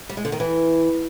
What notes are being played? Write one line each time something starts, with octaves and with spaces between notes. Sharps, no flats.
G3
G#3
D3
D#3
E3